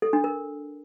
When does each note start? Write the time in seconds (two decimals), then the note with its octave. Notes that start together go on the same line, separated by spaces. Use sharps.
0.02 A4
0.13 D4
0.24 A#4